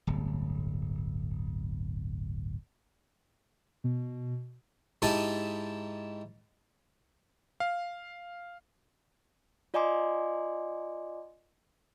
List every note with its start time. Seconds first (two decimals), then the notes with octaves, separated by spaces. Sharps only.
0.07 D1 G1
3.84 B2
5.02 G#2 D#4 E4 G4 A5 D#6
7.60 F5
9.74 F4 D5 D#5 G#5 C6 D6